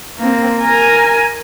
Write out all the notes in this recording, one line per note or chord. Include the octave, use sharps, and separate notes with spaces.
A#3 C4
A#4 G#5